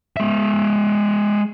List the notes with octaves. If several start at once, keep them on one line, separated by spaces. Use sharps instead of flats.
G#3 E5